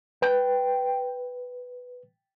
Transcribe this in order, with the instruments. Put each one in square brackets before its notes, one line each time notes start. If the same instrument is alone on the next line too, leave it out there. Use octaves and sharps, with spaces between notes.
[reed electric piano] B4 [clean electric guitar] G5